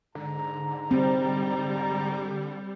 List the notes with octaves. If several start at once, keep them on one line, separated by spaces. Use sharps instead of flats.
G#2 D3 A#5
G3 C4